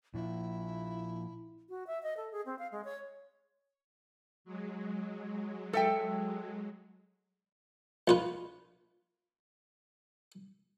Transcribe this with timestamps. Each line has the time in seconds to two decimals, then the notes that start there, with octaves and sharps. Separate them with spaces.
0.14 A#2 F3 E4
1.69 F#4
1.87 E5
2.03 D#5
2.17 A4
2.32 G#4
2.46 C4
2.59 F5
2.72 G#3
2.84 C#5
4.45 F#3 G#3
5.73 A4 E5 G5
8.08 A#1 F4 B4